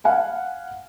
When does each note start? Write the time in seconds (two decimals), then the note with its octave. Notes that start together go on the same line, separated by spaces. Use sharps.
0.04 F5 F#5 G#5 B5